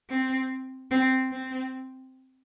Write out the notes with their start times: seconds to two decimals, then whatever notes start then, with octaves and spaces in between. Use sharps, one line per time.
0.10 C4
0.91 C4
1.32 C4